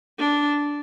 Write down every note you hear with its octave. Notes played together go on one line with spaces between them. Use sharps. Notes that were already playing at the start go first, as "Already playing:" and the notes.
D4